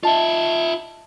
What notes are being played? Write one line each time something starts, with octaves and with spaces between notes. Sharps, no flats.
F4 D#5 E5 A5